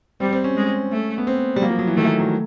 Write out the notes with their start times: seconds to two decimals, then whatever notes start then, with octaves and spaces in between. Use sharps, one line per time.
0.20 G3 C4
0.32 C4
0.44 C#4
0.57 G#3
0.91 A3
1.18 B3
1.27 C4
1.56 G3
1.61 F#3 A#3
1.70 F3
1.79 F#3
1.88 E3
1.96 D#3 A3
2.20 F#3